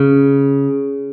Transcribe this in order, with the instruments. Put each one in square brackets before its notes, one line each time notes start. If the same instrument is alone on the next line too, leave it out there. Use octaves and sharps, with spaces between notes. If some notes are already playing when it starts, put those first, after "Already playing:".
Already playing: [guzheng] C#3